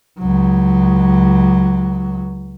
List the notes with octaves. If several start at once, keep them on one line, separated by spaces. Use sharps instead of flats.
C#2 F#3